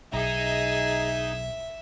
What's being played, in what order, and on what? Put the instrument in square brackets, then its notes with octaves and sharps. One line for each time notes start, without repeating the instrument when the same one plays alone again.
[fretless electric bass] B1 [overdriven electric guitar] D#4 [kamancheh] G#4 [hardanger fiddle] E5